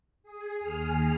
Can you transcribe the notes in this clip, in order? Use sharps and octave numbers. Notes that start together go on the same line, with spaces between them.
G#4
D#2 G#4 F6